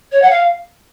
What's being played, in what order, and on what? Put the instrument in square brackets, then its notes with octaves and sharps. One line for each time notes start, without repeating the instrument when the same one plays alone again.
[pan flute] C#5
F#5
F5